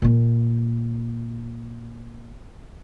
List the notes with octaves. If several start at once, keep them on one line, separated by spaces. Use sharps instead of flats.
A#2 A#3